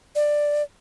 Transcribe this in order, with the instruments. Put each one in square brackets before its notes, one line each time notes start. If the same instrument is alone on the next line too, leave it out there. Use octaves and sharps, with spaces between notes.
[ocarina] D5